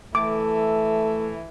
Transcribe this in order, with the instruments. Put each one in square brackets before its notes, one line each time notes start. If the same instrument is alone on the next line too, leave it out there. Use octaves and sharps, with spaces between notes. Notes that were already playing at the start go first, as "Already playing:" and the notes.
[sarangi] E3 [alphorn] A3 [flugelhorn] A4 [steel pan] D6